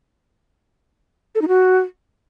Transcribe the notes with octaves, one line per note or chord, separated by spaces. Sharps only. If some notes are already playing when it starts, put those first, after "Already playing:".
A4
D#4
F#4